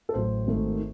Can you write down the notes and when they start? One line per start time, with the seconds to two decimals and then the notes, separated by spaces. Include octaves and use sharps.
0.09 A4
0.14 A1 A2 F#3 A3 C5
0.47 G#1 G#2 D#3 A3